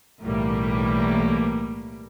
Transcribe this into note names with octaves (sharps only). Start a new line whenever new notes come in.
B1 A2 E3 G3 A#3